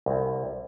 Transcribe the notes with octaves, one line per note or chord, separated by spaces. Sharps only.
C2